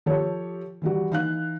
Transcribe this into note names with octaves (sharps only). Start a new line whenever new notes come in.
F3 G4 A4 C#5
E3 G3 F#4
E3 D#4 F5 F#6